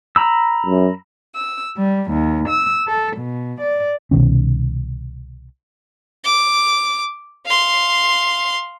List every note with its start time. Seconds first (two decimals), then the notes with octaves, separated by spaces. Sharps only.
0.16 A#5 B5 E6
0.66 F#2
1.35 E6
1.78 G3
2.12 D#2
2.49 E6
2.88 A4
3.18 B2
3.61 D5
4.11 C2 B2 D#3 C#4
6.24 D6
7.46 F5 C6